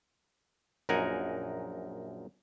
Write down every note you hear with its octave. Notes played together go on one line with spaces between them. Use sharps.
A#1 F#2 D#4 A#4 F#5 G#5